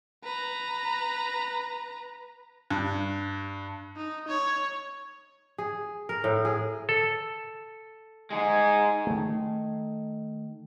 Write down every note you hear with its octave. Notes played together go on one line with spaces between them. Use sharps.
B4 A#5
G2
D#4
C#5
G#4
A#4
A2
G#4
A4
G#3 D#4 G#5
D#3 A3